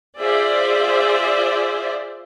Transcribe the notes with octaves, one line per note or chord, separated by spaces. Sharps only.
F4 G#4 C5 D5 E5